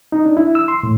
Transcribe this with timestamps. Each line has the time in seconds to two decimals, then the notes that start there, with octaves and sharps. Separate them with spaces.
0.12 D#4
0.26 D4
0.37 E4
0.55 E6
0.68 C6
0.83 A2